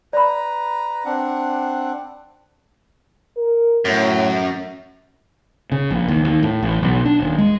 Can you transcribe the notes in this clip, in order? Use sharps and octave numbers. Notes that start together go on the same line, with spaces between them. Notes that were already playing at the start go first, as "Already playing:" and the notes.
B4 D5 A#5 B5
C4 D4 F#5
A#4
F#2 A2
C#3
A#1
D#2
D#2
A2
A1
B1
D4
D#1
G#3